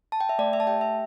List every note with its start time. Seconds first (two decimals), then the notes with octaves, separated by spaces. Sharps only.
0.12 A5
0.21 G5
0.29 E5
0.39 A3 D5
0.53 E5
0.60 A5
0.67 G4 G5
0.81 E5